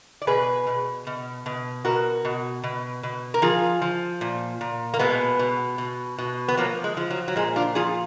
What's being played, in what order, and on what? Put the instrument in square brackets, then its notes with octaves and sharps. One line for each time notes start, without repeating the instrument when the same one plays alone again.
[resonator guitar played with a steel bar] D5
B2 G#4 B4
B2
B2
B2
B2 F#4 A#4
B2
B2
B2
A#4
F3 F4 G#4
F3
A#2
A#2
A#3
B2 G#3 B3
B2
B2
B2
B3
F3 F#3 A#3
G#3
F3
F#3
F#3
A#2 G#3
D4 F4
F3 F4 G#4